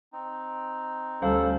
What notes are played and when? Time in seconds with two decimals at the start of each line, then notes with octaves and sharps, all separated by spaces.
0.13 C4 D#4
1.22 D2 G3 C#4 A4 C5 F5